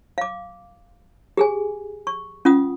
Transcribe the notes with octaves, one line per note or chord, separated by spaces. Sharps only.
F5 D6
G4 G#4 G#5
C#6
C#4 F4 F#5 D#6